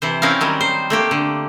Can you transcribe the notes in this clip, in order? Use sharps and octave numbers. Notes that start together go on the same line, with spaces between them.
C3 E3 C5
C4 C#4 D#4 E4 A#4 F5
D#3 F#3 G3
C5
A3 A#3 G4
D3